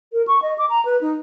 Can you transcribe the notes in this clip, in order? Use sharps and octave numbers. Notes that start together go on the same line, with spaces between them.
A#4
C#6
D#5
D6
A#5
B4
D#4